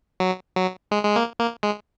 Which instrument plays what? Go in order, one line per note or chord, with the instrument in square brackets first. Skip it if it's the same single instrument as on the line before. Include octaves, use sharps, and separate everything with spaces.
[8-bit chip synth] F#3
F#3
G#3
G#3
A#3
A#3
G#3